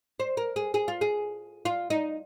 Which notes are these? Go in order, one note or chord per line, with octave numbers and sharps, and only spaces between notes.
C5
A#4
G#4
G#4
F4
G#4
F4
D#4